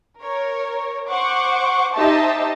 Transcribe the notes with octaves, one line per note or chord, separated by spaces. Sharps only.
A#4 C#5
C5 F#5 C#6 D6
D#4 G4 C5 D#5 E5 A5